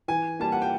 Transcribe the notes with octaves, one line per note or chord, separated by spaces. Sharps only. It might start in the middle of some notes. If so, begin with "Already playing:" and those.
E3 G#5
G3 A#3 A5
F#5
G5